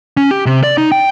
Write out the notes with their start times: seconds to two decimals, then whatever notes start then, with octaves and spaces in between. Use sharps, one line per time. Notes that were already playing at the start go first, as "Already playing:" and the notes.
0.17 C#4
0.31 G4
0.46 C3
0.63 D5
0.78 D#4
0.92 G5